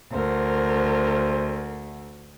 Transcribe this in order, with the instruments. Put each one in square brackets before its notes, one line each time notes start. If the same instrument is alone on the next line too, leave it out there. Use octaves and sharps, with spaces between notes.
[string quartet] D2 [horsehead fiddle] A#4 [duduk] C5